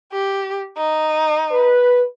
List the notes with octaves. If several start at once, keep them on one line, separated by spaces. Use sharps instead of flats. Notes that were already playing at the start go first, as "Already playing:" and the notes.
G4
D#4
B4